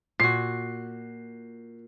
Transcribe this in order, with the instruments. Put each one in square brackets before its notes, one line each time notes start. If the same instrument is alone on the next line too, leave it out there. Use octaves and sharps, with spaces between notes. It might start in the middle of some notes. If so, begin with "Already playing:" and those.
[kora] A#2 F#4 [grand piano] C7